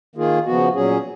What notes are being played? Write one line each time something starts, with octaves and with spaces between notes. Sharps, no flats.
D#3 A#3 F4 G#4
C#3 F3 B3 F#4
A#2 F#3 C#4 G#4